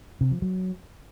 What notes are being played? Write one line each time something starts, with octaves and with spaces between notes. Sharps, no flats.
C3
F3
F#3